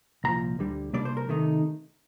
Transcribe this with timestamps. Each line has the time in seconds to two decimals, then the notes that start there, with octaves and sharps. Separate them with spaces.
0.24 C2 A#2 F3 A#5
0.59 D2 D3 G3
0.93 C3 G3 A#3 D4 D5
1.05 C5
1.17 A#4
1.28 C3 D#3 A3 D#4